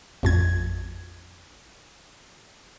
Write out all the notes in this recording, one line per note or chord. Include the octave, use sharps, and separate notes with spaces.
A1 F2 G#6